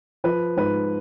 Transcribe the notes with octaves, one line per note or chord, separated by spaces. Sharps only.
F3 B4
G#2 B4